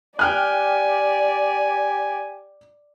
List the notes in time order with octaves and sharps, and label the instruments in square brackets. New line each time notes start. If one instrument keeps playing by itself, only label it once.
[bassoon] G4 [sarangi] D5 [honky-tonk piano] G5 F6 F#6 [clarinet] G#5